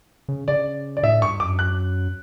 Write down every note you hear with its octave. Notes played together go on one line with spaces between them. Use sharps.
C#3
C#3 D5
D5
A2 E5
G2 C#6
F#2 D6
F#6